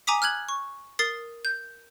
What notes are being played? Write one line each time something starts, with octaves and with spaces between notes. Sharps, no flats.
G#5 A#5 D6 D#6 B6
F6 F#6 G#6 F#7
C#6
A#4 D#6 A6 C7
G6